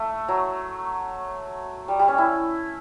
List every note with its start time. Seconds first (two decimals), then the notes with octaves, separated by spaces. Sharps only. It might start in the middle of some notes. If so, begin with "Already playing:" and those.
Already playing: A3
0.28 F#3
1.88 G3
1.99 G3
2.08 C#4
2.18 E4